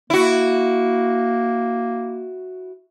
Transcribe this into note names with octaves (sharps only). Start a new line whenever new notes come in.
A#3 E4 F#4